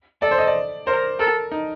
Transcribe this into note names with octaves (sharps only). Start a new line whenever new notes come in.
A4 D5
C5
D#5
D5
A#4 C5
A4 A#4
D#4